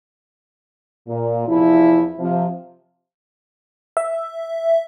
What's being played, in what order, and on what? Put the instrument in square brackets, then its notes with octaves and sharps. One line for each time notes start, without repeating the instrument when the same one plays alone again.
[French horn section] A#2
E2 C3 F3 E4
C3 F3
[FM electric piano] E5